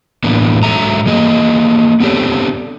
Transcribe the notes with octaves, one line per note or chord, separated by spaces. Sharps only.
A2 E3 A#3 B3 D4
G#2 F#3 A4 E5 A#5
E3 A#3 G#4 D#5
B3 C4 D4 G4 A4 C#5